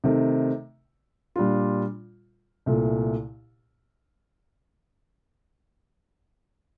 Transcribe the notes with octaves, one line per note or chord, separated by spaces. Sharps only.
C3 D#3 A3
A#2 G3 D4 F4
C2 A#2 A3